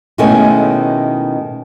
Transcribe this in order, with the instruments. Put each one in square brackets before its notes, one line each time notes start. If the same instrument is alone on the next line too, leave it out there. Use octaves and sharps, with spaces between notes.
[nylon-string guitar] B2 D#3 G#3 A3 C#4 E4